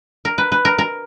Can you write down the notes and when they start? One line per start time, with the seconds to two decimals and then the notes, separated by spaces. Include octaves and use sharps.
0.25 A#4
0.38 B4
0.52 B4
0.65 A#4
0.78 A#4